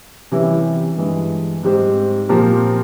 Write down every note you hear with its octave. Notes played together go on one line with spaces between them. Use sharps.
C3 E3 G3 C#4 E4
G2 E3 G#3
G#2 G3 C4 G4 C5
A#2 F3 C4 G4 A#4